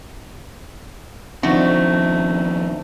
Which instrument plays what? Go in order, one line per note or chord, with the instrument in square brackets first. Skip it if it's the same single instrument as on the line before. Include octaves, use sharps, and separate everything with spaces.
[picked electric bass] D#3 F3 C4 [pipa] A3 F#4 [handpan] D4 D#4 C5